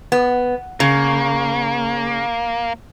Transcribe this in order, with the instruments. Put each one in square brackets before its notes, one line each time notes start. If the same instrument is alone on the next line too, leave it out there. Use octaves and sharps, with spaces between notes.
[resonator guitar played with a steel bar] B3
[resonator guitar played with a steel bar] C#3 [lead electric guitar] A#3